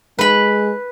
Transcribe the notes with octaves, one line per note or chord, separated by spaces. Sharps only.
G#3 B4 B5